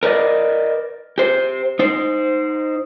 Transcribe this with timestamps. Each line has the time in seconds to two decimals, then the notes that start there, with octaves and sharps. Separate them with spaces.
0.03 A#4 B4 D5 D#5
1.18 G4 C5
1.79 D#4 C5